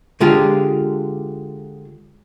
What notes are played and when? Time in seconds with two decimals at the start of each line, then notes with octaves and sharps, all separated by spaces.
0.20 D3 G#3 F4 G4